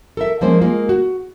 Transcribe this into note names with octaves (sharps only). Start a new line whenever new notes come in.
A4 A#4 E5
F3 G#3 A#3 C#4 A#4 C5
G#3 A#3 F4
F#4